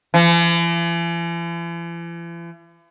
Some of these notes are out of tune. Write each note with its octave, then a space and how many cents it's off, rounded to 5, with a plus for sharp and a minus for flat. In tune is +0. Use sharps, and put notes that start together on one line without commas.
E3 +45